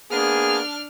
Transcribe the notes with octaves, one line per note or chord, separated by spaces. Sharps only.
A#3 B3 D4 G#4 F6